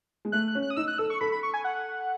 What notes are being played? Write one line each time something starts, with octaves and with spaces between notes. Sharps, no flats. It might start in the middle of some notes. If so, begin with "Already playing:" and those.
G#3
A3 F#6
F#6
C#4
F#6
D#6
D#4 E6
F#6
A4 E6
C#6
A4 B5
B5
C#6
G#5
F#5